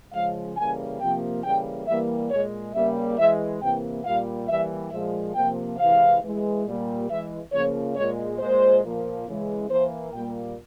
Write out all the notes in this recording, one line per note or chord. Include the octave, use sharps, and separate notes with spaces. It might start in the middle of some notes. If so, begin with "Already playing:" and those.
C#3 F3 G#3 F5
C#3 E3 G3 A#3 G#5
C3 F3 A#3 G5
C#3 E3 G3 A#3 G5
E3 G3 A#3 E5
A#2 G#3 C#5
C#3 G3 A#3 E5
E3 G#3 E5
C3 E3 A#3 G5
A#2 G3 A#3 F5
E3 G3 A#3 E5
A#2 F3 G#3 E5
C3 F3 A#3 G5
C3 E3 G#3 F5
E3 G#3
A#2 G3 A#3
E3 G#3 E5
C#3 F3 A#3 C#5
A#2 G#3 C#5
A#2 G#3 C5
A#2 F3 A#3
C#3 E3 G#3
E3 A#3 C5
A#2 G3 A#3 G5